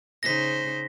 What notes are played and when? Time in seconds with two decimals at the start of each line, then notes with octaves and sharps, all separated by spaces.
0.23 C#3 D#4 C5 A#6 B6